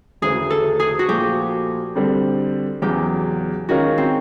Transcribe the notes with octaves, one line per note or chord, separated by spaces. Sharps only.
E1 D2 C#3 E3 G#4
A4
G#4
F#4
A#2 F3 A3 G4
D3 G3 C4
E2 C#3 F#3 G4
D#3 G#3 C#4 F4 F#4 A#4
C4